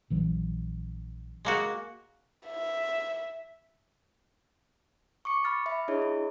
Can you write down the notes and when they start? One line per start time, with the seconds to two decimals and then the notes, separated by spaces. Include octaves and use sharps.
0.10 A#1 E3 F#3
1.45 G#3 A#3 F#4
2.47 E5
5.25 C#6 D6 C#7
5.44 B5 D6 F6 A6 C#7
5.66 E5 B5
5.88 D4 E4 G#4 C#5 D#5
6.02 E4